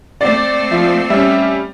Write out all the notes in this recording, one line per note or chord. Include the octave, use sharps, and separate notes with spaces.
A3 C4 D5
F3 E5
G3 C#4 E5